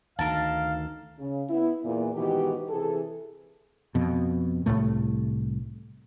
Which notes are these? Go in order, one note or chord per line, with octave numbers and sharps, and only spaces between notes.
D2 D#3 A4 A#4 F5 A5
C#3
B3 E4
E2 A#2
G#2 B2 D#3 E3 G4
C3 E3 G#4 A4
F2 B2
C2 F2 A2 A3